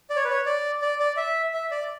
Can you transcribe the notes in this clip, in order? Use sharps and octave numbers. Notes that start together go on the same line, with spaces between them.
D5
C#5
B4
C#5
D5
D5
D5
E5
E5
D5